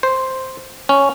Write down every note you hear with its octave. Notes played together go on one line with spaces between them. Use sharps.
C5
C#4